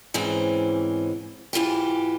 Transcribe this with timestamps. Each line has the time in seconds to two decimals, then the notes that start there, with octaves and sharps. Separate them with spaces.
0.14 G#2 E3 C4 C#4
1.53 G#2 E3 F4 G4